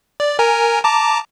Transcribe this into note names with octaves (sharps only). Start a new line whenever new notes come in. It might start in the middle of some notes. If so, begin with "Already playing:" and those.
D5
A#4 G#5 A#5
A5 A#5 D6